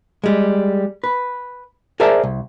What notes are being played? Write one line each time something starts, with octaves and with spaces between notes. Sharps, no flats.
G3 G#3
B4
G#4 A#4 C5 D5 E5 A5
C2